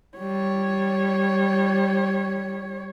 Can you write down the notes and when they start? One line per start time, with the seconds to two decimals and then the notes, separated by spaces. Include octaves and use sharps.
0.18 G3 C#5